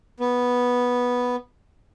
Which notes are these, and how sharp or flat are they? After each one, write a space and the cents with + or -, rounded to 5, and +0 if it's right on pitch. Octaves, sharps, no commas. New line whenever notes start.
B3 -5